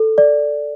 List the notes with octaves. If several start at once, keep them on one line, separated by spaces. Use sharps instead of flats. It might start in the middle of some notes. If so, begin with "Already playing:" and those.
Already playing: A4
D5